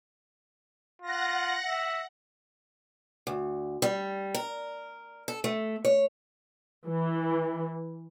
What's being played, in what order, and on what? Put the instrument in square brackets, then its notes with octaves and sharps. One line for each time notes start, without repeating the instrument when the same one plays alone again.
[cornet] F4 [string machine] F#5 A#6
[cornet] E5
[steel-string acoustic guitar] D2
G3
A#4
A4
A3
C#5
[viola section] E3